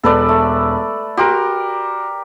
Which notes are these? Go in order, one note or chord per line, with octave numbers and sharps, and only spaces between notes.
E1 A4 B4 D5
A3
F#4 G4 A#4 C6 D7